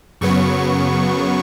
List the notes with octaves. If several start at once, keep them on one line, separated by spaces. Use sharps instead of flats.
F#2 C#3 F#3 B3 C#6